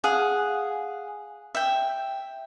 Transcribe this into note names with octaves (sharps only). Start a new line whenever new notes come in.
G#4 F5 F#5
E5 G5